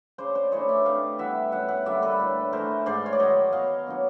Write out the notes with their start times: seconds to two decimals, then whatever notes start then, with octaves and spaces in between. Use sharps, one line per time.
0.18 C#3 C5 D5
0.35 C5 D5
0.52 E3 A3 D4 C#5 D#5
0.69 D5 E5
0.86 C3 D#5 F5
1.18 E3 G3 B3 E5 F#5
1.52 F#2 E5 F#5
1.68 E5 F#5
1.85 D3 G3 A#3 D5 E5
2.02 A4 B4
2.20 A2
2.53 E3 A3 A#4 C5
2.86 G#2 C5 D5
3.06 C#5
3.13 D5
3.19 D#3 F#3 C#5 D#5
3.52 B2 D#5 F5
3.87 F#3 A#3 D4